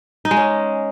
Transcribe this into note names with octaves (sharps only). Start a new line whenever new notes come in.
D#4
G#3
C#4